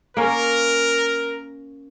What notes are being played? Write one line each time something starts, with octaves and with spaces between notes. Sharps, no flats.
A#3 C#4 A#4